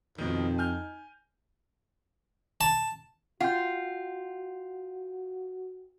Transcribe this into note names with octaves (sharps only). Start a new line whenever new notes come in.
F2 B2 D#3 D#4
G#5 F6 G6
A5
F4 F#4 F#5 G5 G6